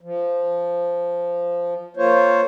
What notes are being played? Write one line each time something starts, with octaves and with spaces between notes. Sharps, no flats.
F3
A#3 F4 C5 C#5